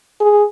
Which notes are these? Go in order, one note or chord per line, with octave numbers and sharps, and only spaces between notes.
G#4